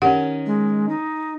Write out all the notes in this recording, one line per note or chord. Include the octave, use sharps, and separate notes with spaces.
D#3 C#4 G4 F#5
G#3
D#4